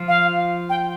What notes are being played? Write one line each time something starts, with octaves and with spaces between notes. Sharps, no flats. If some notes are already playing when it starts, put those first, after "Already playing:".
Already playing: F3 F4
F5
G5